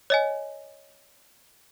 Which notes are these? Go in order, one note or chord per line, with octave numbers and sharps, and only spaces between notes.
C#5 D#5 G#5